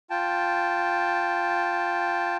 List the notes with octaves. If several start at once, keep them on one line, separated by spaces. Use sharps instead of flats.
F4 G5 A5